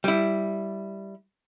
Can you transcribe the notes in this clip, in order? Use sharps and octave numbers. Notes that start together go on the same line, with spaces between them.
G3 E4